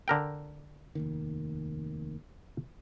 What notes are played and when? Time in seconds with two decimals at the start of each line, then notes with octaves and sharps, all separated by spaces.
0.08 D3 A#4 G5
0.95 F1 D#2 D#3